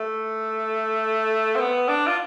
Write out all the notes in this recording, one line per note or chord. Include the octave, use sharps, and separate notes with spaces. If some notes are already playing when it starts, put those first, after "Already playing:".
Already playing: A3
C4
B3
D4
F4